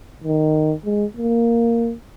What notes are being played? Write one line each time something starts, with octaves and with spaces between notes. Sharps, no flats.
D#3
G#3
A#3